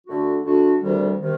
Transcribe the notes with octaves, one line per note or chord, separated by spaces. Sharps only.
D3 A3 D4 F#4
D3 A3 D4 F#4
D2 C3 D#3 G3
C3 D#3